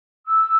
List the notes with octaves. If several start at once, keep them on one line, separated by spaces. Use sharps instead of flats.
E6